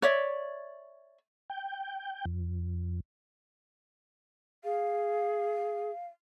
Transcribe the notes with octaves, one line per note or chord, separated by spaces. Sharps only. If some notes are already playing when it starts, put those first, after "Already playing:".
C#5 D5 E5
G5
F2
G#4 F5